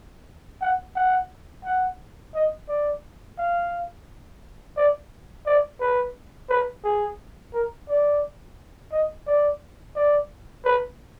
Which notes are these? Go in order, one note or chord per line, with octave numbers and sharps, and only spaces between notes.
F#5
F#5
F#5
D#5
D5
F5
D5
D5
B4
B4
G#4
A#4
D5
D#5
D5
D5
B4